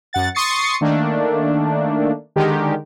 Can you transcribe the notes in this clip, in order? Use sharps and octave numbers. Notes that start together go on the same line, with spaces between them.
F#2 F#5 A6
C6 C#6 D#6 A6 C7 C#7
D#3 A3 A#3 D4
D3 D#3 G#3 G4 A#4